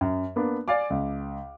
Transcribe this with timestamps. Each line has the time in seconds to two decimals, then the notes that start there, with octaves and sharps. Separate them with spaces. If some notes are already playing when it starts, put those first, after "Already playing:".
0.01 F#2
0.36 A#3 B3 D4
0.68 D5 F5 G#5 D6
0.90 C#2